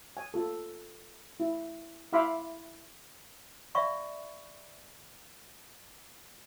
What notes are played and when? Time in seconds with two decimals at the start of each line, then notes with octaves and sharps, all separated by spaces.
0.17 G#5
0.34 F4 A4
1.40 E4
2.13 E4 E5 F5 B5 C6 D6
3.75 D5 E5 F5 B5 C#6